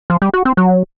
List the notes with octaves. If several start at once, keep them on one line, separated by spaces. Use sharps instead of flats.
F3
G3
F#4
C4
F#3